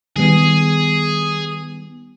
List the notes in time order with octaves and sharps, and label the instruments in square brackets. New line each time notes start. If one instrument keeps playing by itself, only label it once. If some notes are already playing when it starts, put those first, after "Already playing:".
[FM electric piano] D#3 G3 B3 [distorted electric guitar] G#4